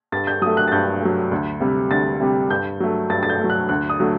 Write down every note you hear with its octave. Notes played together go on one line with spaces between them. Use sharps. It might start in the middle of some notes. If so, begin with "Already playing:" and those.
G2 A6
G6
F#3 A3 D#6
F#6
A6
G2 G6
F#3 A3
D2
C3 G3
D2 A6
C3 G3
G2 G6
F#3 A3
G2 A6
A6
G6
F#3 A3
F#6
D2 F#6
D#6
D3 F#3 A3